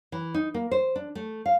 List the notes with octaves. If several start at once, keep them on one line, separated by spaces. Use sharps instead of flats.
E3
D#4
A#3
C5
D4
A3
F5